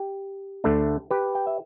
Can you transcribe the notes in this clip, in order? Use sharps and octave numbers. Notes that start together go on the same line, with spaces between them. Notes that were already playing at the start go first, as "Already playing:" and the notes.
Already playing: G4
D2 D3 A3 D4
G4 B4
G5
E5